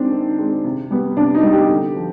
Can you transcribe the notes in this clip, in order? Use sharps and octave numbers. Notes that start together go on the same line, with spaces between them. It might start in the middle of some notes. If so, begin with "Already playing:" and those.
Already playing: D#3 G#3 C4 D4
D#3
G#3 C4
C3
G3 B3
C3 D4
D#4
G3 B3
G4
D3
F3